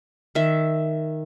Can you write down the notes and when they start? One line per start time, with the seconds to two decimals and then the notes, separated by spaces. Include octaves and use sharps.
0.35 D#3 E5